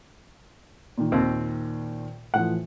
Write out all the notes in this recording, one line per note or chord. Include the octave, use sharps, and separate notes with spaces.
A#2 D#3
D#2 C4
A2 E3 F3 F#5